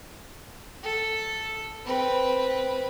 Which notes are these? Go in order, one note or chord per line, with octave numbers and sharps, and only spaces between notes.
A4
C4 B4